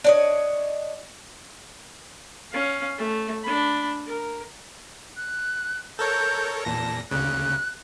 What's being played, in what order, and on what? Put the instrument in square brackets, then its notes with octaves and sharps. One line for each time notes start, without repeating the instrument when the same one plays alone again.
[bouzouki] D4 C#5 D#5
[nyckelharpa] C#4 F5
A3
D4 B5
A#4
[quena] F#6
[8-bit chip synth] A4 A#4 C#5 [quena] G6
[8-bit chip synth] E2 A#2 A#6 [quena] A5
[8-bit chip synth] D2 C#3 [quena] F#6